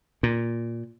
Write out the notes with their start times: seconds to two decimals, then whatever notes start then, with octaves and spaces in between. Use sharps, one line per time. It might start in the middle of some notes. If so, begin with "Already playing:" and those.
0.23 A#2